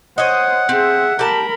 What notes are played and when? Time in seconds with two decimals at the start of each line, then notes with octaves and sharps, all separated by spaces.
0.18 C5 C#5 D#5 F#5
0.69 C4 G#4 E5
1.19 G4 A#4 A5 B5